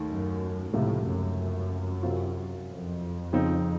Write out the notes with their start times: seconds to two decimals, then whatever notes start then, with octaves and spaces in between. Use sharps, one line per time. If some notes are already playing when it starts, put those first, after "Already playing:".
Already playing: D#2 D#3 A3
0.08 F#2
0.73 C#2 A2 C3 F3 A3
1.06 F#2
2.03 C3 F#3 C4 F4
2.68 F2
3.33 C#3 F3 C4 D#4